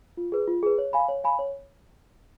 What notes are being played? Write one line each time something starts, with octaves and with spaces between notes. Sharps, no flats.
F4
G#4 B4
F4
G#4 B4
C#5
F5 G#5 B5
C#5
F5 G#5 B5
C#5